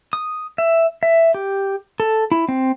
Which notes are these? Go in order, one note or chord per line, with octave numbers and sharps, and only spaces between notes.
D#6
E5
E5
G4
A4
E4
C4